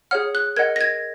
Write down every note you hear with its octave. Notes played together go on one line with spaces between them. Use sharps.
G#4 C#5 F#5 F6
F#6
A#4 D#5 F#5 G#6
A#6
G#6